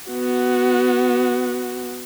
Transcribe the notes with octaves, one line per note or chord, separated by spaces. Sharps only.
B3 F#4